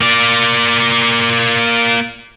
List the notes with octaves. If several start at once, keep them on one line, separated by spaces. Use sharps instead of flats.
A#3 D5